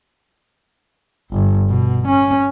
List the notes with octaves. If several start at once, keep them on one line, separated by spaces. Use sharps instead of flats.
G1
B2
C#4